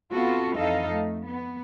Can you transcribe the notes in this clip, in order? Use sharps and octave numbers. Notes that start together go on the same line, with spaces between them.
B3 C4 F4 F#4 A4
F2 E3 D#4 A4 D#5 F5
A3
B3